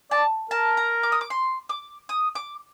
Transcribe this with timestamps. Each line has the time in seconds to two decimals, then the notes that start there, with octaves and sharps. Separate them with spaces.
0.11 D5 A5
0.51 A#4 A5
0.77 A#5
1.03 D6
1.12 D#6
1.21 D6
1.30 C6
1.69 D6
2.09 D#6
2.35 D6